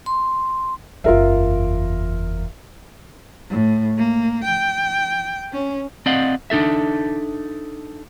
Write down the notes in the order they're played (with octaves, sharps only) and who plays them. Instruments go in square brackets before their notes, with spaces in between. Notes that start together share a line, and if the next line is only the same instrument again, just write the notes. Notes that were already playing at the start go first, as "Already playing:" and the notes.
[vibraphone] C6
[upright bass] F#1 E2 [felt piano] F4 A#4 E5
[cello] A2
A#3
G5
C#4
[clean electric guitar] C4 D5 D#5 F5 F#5
D4 D#4 A4 E5